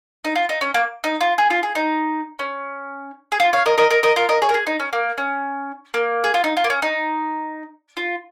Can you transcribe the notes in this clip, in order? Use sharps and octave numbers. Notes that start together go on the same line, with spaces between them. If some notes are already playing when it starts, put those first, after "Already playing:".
D#4
F4
D#4
C#4
A#3
D#4
F4
G#4
F4
G#4
D#4
C#4
G#4
F4
C#5 F5
A#4 D#5
A#4 D#5
A#4 D#5
A#4 D#5
F4 A#4
A#4 D#5
G#4 C#5
A#4
G#4
D#4
C#4
A#3
C#4
A#3
G#4
F4
D#4
F4
A#3
C#4
D#4
F4